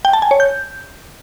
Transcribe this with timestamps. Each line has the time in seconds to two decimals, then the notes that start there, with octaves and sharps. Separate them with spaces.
0.05 G5
0.13 A5
0.22 G#5
0.31 C#5
0.40 G6